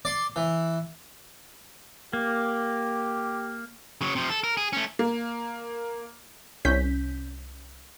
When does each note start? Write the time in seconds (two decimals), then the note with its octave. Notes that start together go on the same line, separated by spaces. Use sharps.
0.05 D5 C6
0.36 E3
2.13 A#3 G4
4.01 C#3 F#3
4.15 C3 F3
4.30 A4
4.44 A#4
4.57 G#4
4.73 A3 C#4
4.99 A#3
6.65 C2 C#4 G6 B6